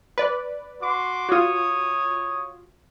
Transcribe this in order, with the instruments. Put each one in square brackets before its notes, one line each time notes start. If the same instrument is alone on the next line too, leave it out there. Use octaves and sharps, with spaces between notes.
[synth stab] B4 D5
[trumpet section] F#4 C6 D6
[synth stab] F4 F#4 [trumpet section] C#5 D#6